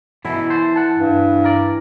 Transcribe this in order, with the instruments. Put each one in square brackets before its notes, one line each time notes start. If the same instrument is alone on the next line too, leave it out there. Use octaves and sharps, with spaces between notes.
[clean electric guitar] F#2 B2 E4 [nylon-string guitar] E3
[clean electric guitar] E2 A4 C5
F#5 A5
[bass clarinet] G2
[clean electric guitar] A#4 D5